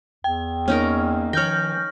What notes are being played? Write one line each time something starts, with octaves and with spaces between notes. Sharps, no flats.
E2 G5
A#3 B3 C#4 D#4 A#4
D#3 F3 C#5 G5 F6 G6 A#6